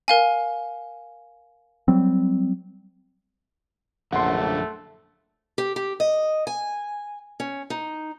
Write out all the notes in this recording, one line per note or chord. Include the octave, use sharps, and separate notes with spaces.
A#4 F5 G#5
F#3 G3 C4
A#1 F#2 D3 A3 F#5 C6
G4
G4
D#5
G#5
C#4
D#4